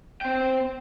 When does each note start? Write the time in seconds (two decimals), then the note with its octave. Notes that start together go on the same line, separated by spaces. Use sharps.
0.21 C4 G5